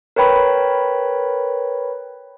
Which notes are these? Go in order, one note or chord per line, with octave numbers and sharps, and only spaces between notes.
A#4 B4 C#5 G5 B5